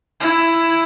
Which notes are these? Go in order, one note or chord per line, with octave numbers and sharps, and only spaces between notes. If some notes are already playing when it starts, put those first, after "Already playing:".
E4